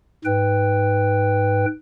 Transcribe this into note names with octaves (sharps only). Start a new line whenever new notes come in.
G#2 B4 G5